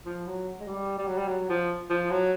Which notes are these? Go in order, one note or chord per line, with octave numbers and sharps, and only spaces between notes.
F3
F#3
G#3
G3
G3
F#3
G3
F#3
F3
F3
F#3